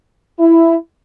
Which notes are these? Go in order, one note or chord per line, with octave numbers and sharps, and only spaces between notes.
E4